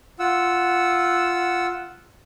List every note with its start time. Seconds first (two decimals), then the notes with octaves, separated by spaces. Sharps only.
0.19 F4 F#5 E6